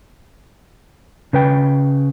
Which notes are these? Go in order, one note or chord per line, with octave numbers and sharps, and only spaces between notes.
C#3 B4 G5